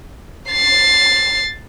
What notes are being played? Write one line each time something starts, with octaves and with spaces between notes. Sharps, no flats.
A6 C7